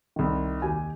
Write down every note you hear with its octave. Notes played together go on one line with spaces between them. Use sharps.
C2 D#3
D#2 G4 G#5